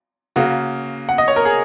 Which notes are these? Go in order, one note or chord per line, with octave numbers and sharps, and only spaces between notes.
C#3 A#3 F#4
F#5
D#5
C#5
A#4
G#4